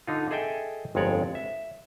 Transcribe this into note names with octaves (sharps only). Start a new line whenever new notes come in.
D3 D#4 F4
G#4 A4 D#5 E5 G5 G#5
G1 F2 G#3 C#5 D5
E5